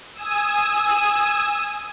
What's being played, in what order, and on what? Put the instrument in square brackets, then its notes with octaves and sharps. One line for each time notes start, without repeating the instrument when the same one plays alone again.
[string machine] G#5 D#6 E6